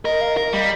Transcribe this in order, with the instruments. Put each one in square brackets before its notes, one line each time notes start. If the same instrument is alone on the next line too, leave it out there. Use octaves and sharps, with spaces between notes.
[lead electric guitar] A#4 [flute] D#5
[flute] F5
[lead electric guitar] A#4 [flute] D#5
[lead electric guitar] G3 [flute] D#5